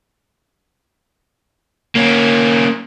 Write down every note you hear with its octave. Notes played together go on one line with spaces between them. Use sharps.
A#3 C#4